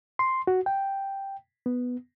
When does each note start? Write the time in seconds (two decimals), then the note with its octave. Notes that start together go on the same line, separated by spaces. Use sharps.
0.19 C6
0.47 F#4
0.66 G5
1.66 B3